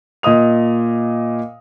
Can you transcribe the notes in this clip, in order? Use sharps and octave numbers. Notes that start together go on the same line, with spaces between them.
A#2 D#5 D#6 F7